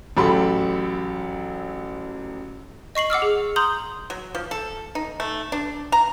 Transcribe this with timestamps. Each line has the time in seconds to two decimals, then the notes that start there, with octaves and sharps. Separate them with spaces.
0.17 A1 F#3 G4 A4 B5 C6
2.95 D#5 C#6 C7 F#7
3.10 F#5 D6 E6 F6
3.22 G#4
3.56 A#5 C6 D#6 G6 F#7
4.10 F#3
4.35 F3
4.51 A4
4.95 D#4
5.20 A3
5.52 D4
5.92 A#5